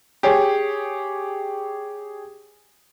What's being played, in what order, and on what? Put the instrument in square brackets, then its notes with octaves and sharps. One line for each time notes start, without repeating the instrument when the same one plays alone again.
[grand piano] G4 G#4 C#5